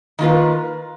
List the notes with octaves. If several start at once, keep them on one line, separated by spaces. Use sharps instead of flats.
D#3 A#3 F4 B4